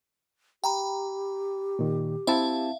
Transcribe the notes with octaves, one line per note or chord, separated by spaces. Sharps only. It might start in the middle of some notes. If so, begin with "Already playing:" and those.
G4 G5 A#5 B5
A#2 D#3
C4 E4 E5 F5 A5